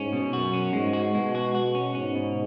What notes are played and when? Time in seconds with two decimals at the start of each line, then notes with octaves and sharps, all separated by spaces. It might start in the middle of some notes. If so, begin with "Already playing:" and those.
Already playing: G#2 C#4
0.13 B2
0.33 F#2 F#4
0.53 C#4
0.73 G#2 G#3
0.93 F#4
1.14 B2 G#3
1.35 F#4
1.55 F#4
1.75 C#4
1.95 G#2 C#4
2.15 B2